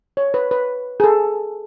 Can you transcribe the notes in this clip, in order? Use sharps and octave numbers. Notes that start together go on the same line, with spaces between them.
C#5
B4
B4
G#4
A4